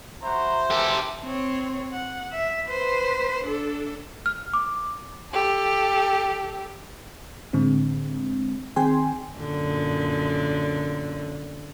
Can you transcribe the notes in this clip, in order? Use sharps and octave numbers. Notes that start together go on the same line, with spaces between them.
E4 F#4 C5 A#5
E3 G4 A4 A#4 D6
C4 C#5
F#5
E5
B4 C5
D4 A4
F6
D6
G4 A4
A2 D3 G#3 C4
D#3 C4 G#4 G5 G#5 C6
F#2 A#2 D3